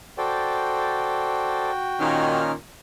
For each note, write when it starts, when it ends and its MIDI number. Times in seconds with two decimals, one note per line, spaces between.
0.18 2.41 66
0.18 1.70 69
0.18 1.70 72
0.18 1.70 74
0.18 2.41 79
2.00 2.53 46
2.00 2.53 51
2.00 2.52 61
2.00 2.52 63
2.00 2.52 89